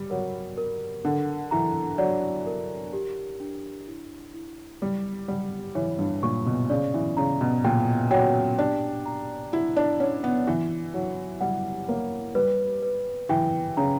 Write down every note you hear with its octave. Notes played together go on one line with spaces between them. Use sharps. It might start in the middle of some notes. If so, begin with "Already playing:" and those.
Already playing: G3 B5
F#3 A#4
A#4
D3 F#5
E3 A#5
F#3 D5
A#4
G4
D4
E4
E4
G3 G4
G3 F#5
E3 C#5
G2
A#2 C#6
B2
C#3 D5
E3
C#3 A#5
B2
A#2 G5
F#3 G5
D4 G4
A#5
E4 F#5
D4
C#4 F#5
B3
E3 E4
F#3 E4
G3 F#5
A#3 C#5
G3 B4
B4
E3 G5
C#3 A#5